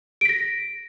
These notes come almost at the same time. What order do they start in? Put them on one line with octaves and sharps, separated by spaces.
D7 B6 A#6